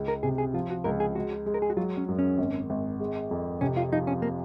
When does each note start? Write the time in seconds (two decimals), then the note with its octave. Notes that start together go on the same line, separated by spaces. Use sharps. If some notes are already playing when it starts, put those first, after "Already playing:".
Already playing: C#2 G#3
0.08 A#4
0.23 C3 G#4
0.38 G#4
0.54 F3 F4
0.70 F#4
0.84 C#2 A#4
1.00 G#4
1.15 G#3 F#4
1.46 G#3
1.54 A#4
1.62 G#4
1.70 F#4
1.77 F#3 F4
1.97 C#4
2.08 F#2
2.19 C#4
2.38 G#1
2.70 G#1
3.00 G#3
3.31 F2
3.61 C3 C#4
3.77 F4
3.92 F3 D#4
4.07 C#4
4.22 A#3